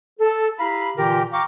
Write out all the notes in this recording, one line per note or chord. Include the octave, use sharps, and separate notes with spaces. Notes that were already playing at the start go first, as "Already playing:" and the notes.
A4
E4 G4 F5 A#5 B5
A#2 D3 E3 F4 G4 A#4
F5 G5 A#5 C#6 D6